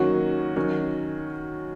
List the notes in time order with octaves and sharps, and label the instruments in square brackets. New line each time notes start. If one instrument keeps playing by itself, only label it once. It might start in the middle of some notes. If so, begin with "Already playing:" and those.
Already playing: [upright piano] D#3 F#3 A#3 C#4 F#4
D#3 F#3 C#4